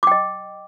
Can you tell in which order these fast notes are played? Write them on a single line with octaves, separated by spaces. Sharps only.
D6 G5 D#5